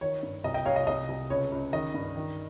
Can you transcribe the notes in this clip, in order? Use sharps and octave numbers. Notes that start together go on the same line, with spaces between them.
D#3 C#5
G2
C2 D#5
D#5 G5
C2 C#5 F5
D#5
C2 D#5
C2
C#2 C#5
C#2
D#3 D#5
G2
D#3